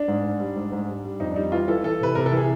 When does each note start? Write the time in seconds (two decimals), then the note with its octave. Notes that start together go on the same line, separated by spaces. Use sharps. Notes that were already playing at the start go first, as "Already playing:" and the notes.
Already playing: D4
0.08 G#2
0.24 G#2
0.40 G3
0.56 G#2
0.72 G#2
0.88 G3
1.05 G3
1.20 F2 D#4
1.32 D4
1.36 G3 D#4
1.52 E3 F4
1.68 E3 A4
1.84 E3 A4
2.00 C3 B4
2.15 C3 A#4
2.26 A4
2.32 E3 G#4